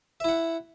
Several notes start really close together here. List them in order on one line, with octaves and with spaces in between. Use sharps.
E5 E4 F#5